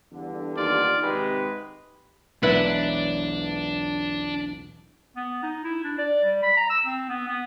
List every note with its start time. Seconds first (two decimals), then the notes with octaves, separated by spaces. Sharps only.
0.12 E2 G2 D3
0.57 D#2 F4 D5
1.03 G#1 G#2 C3 G#3 G4 B4
2.43 B1 E2 D4 E4 B4 F#5
5.16 B3
5.43 D#4
5.64 E4
5.84 D4
5.98 D5
6.23 G3
6.43 B5
6.57 A#5
6.70 E6
6.86 C4
7.09 B3
7.27 B3